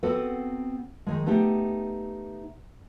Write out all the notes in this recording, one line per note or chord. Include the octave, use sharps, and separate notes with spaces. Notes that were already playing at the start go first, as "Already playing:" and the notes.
B3 C4 F#4 A4 B4
D#3 F3 G#3
A3 B3 D#4 G4